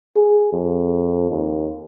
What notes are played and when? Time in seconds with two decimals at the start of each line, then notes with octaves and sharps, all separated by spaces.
0.16 G#4
0.52 F2
1.30 D#2